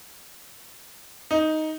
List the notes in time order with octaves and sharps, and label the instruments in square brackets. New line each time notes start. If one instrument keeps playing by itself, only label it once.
[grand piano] D#4